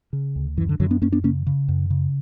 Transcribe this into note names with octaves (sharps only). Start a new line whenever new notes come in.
C#3
D2
F#2 E3
D3
F#2 D3 F#3
B3 D4
F#2 A#3 C#4
B3 D4
C#3 A#3 C#4
C#3
F#2
C#3